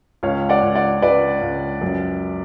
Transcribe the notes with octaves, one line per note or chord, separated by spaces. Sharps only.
C#2 C#5 F5
D5 F#5
C#2
D5 F#5
C#2 B4 D5
C#2
F#2